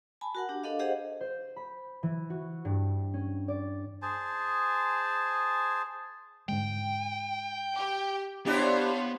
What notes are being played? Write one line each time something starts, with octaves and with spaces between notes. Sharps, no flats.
G#5 A5 B5
F#4 A#4 F#5
D4 G4
D4 A4 D#5 F5
G4 G#4 C5 D#5 F5 F#5
C5
B5
E3
F#4
G2
C#4
D5
G#4 C5 G#5 A5
G#2 D3 G#3 G5
G4
B3 D4 E4 G4 C5 C#5 F5